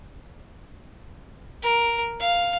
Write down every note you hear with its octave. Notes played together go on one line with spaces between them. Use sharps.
A#4
F5